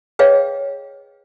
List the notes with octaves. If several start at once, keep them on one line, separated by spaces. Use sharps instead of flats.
G#4 B4 C#5 D#5 F5 G5